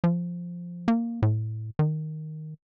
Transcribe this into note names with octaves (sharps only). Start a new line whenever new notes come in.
F3
A#3
A2
D#3